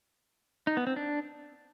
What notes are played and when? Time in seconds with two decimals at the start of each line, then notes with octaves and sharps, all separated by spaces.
0.67 D#4
0.77 B3
0.87 C4
0.96 D4